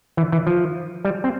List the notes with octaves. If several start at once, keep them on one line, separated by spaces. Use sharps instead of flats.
E3
E3
F3
G3
C4